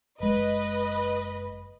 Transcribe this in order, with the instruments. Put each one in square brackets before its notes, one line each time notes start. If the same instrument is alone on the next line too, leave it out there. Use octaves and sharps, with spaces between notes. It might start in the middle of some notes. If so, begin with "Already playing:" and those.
[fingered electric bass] F#1 G#3 [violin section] B4 D#5